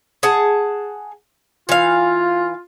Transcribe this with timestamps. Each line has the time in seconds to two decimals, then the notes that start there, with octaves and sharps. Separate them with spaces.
0.23 G#4 F#5 A5
1.69 E3 F4 F5